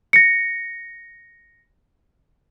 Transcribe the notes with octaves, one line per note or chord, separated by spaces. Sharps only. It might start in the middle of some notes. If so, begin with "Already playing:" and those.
A#6 C#7